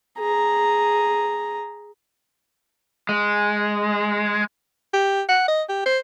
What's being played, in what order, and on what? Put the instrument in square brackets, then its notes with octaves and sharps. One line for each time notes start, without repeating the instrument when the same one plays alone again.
[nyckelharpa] G#4 A#5
[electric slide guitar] G#3
[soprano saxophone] G4
F#5
D#5
G4
C5